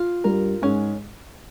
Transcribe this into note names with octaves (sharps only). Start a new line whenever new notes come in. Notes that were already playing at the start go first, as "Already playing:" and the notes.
Already playing: F4
G2 G3 A#4
G#2 G#3 C#4